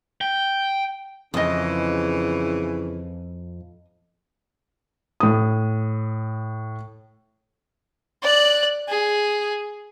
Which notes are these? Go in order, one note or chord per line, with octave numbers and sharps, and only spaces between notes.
G5
F2 C#3 E3 D#5 D#6
A2 D#6
D5 F#6
G#4